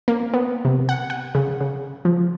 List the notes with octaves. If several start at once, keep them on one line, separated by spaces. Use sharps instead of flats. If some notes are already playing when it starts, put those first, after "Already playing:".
A#3
B3
C3
F#5
F#5
C#3
C#3
F3